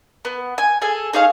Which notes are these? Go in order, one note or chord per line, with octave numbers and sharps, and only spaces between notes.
B3
G#5
G#4 A4 G#5
D#4 G#4 C#5 F5